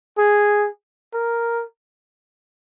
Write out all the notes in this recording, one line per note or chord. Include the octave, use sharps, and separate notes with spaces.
G#4
A#4